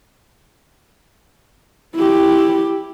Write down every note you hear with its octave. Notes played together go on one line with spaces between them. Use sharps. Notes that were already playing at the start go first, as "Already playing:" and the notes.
E4 G4